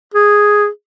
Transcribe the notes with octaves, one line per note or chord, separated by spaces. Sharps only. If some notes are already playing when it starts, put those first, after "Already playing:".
G#4